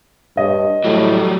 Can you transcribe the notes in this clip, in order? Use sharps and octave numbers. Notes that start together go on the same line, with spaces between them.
G2 C#5 D#5
A2 F#3 G3